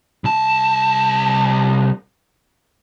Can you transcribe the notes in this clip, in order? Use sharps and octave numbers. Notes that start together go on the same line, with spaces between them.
C2 A5